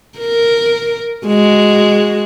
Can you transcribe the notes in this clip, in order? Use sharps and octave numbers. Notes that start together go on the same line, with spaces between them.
A#4
G#3 F#4